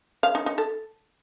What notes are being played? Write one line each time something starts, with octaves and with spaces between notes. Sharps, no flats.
F5
D#4
D#4
A4